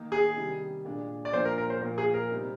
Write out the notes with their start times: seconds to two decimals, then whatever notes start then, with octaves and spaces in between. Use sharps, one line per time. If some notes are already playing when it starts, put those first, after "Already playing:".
Already playing: D#3 A#3 D#4
0.12 G#4
0.37 C3 D#3 G3
0.85 A#2 G#3 D4
1.25 D5
1.33 A#2 F3 A#3 D4 C5
1.45 A#4
1.58 A#4
1.70 C5
1.81 A#2 F3 A#3 A#4
1.98 G#4
2.14 A#4
2.31 C3 G3 C4 D#4